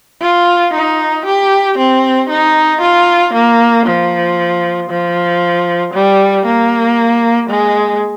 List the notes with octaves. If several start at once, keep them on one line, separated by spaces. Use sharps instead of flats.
F4
D#4
G4
C4
D#4
F4
A#3
F3
F3
G3
A#3
G#3